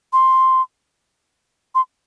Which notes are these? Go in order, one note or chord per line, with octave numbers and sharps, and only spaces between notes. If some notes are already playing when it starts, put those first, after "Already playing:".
C6
C6